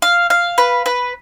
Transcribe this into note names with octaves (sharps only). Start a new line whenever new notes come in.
F5
F5
B4
B4